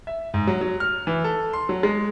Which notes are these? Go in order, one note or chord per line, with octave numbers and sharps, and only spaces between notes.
E5
G#2
F#3
F#3
F6
E3
A4
C6
F#3
G#3